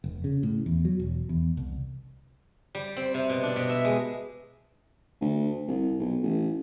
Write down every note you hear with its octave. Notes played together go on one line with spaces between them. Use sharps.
F1
C#3
A2
E2
F#3
E1
E2
C2
G3
C4
C3
B2
D4
B2
E5
G#3
D2
C2
B1
A1